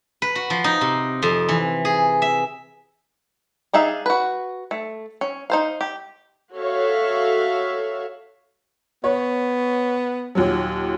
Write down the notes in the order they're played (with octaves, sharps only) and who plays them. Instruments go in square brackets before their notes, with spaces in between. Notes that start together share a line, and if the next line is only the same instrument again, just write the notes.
[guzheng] B4
F#4
F3
D#4
C3
F2
E3
G#4
E5
[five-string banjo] D4 D#4 G#4 E5 F5
F#4 B4
A3
C#4
D#4 C5 F5
G4
[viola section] F#4 A4 C#5 E5 F5
[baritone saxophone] B3 [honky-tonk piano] C#5
[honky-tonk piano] D#2 A#2 F#3